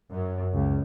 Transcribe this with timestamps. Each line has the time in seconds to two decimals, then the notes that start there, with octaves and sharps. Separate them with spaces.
0.10 F#2
0.54 C#2